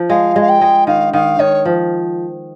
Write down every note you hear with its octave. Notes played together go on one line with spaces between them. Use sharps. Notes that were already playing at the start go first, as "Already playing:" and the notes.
Already playing: F3
G#3 F5
G#3
F5
G5
G#3
D#3 F5
D#3 F5
D#3 C#5
F3